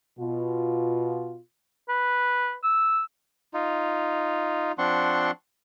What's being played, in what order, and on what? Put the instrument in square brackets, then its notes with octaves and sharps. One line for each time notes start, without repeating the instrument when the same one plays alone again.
[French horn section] B2 F4
[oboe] B4
E6
[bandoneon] D#4 F4
F3 C4 D4 F#5 C6 C#6